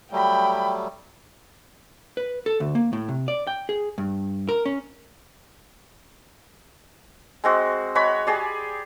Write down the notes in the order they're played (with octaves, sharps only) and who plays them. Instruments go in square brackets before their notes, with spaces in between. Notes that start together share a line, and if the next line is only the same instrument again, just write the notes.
[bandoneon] F#3 G3 A3 [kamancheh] G5 B5
[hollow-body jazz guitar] B4
A4
D2
A#3
A2
C3
D5
G5
G#4
G2
A#4
C#4
[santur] G#3 C4 F#4
G#3 F#4 C#5 B5
G4 G#4 D5